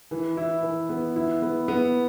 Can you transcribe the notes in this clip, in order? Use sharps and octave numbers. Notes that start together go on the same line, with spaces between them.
E3
E4
E3
B3
E4
B3
B3